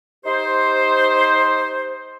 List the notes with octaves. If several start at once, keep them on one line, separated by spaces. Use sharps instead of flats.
D#4 G4 C5